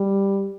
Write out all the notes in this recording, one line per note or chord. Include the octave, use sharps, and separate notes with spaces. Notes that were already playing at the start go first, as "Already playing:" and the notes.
Already playing: G3